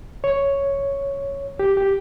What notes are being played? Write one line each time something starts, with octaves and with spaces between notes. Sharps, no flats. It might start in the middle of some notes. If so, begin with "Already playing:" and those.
C#5
G4
G4